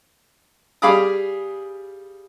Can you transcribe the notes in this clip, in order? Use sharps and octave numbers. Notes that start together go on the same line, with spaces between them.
G3 G#4 F5 B5 D6 D#6